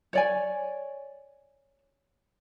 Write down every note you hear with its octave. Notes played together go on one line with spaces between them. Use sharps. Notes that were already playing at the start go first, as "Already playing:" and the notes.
C#5 D5 G#5